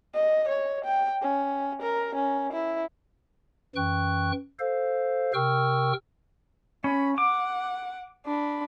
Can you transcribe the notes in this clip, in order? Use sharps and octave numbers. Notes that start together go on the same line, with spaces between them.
D#5
C#5
G5
C#4
A#4
C#4
E4
F#2 E3 G5 C#6 F#6
A4 C5 F5
C3 A#4 G5 C#6 E6 F6
C#4 B5
F#5 D6
D4 B5